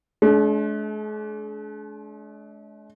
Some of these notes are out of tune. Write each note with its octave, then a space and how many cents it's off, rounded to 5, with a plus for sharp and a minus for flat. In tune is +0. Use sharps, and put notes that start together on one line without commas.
G#3 +45 D4 -30